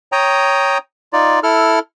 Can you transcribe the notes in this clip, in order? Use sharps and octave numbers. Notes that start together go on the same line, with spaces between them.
C#5 G5 A#5 D#6
D#4 F4 D5
E4 A4 F6